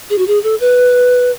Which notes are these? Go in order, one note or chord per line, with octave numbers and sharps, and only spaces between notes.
G#4
F#4
G#4
A4
B4